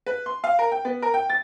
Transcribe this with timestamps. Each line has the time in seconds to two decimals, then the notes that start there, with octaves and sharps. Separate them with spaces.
0.06 B4
0.26 C6
0.44 F5
0.59 A#4
0.72 G5
0.85 B3
1.02 A#4
1.14 G5
1.30 A6